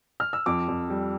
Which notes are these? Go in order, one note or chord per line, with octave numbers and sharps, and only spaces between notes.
F6
E6
F2 D6
F2
G3